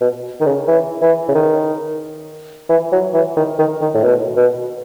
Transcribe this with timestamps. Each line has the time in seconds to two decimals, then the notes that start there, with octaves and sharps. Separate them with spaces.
0.01 B2
0.41 D#3
0.46 C#3
0.68 E3
1.02 E3
1.29 C#3
1.35 D#3
2.69 E3
2.92 F#3
3.14 E3
3.37 D#3
3.59 D#3
3.81 D#3
3.94 A2
4.04 B2
4.37 B2